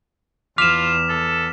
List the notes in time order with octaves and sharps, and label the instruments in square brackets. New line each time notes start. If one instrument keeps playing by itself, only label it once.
[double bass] E2 [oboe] F4 [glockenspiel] D6 F6 F7 [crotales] B6 E7
[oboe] A4